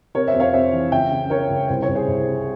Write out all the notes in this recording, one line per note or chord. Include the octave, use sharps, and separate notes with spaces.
C3 A#4 C#5
C5 E5
F2
C#5 F5
C3 C5 E5
E3
C#2 E5 G5
C#3
C#3 A#4 C#5
C#2
C2 C5
C#5
C2
G#4 C5
C2
C3